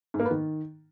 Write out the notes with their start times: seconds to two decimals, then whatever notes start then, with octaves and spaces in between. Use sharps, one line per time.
0.14 G#2
0.20 A#3
0.25 B3
0.31 D#3